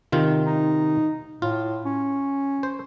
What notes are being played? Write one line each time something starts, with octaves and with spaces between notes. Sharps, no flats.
C3 D#3 F4
D#4
A2 F4
C#4
C5